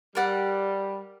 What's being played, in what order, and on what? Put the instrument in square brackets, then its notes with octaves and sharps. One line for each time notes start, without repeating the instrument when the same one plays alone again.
[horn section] G3 [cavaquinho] A#4 D5 F#5